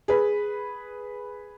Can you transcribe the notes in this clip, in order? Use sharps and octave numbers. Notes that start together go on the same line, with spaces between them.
G#4 B4